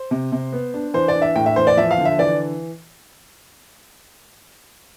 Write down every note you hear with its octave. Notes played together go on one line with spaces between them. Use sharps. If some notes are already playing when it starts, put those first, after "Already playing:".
Already playing: C5
C3
C3
B3
D4
E3 C5
D5
D4
E5
A2 G5
E5
E3 C5
D5
F3 E5
F5
D3
E5
E3 D5